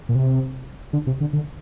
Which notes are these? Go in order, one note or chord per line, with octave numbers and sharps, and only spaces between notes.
A#2
C3
D3
C3
D3
D3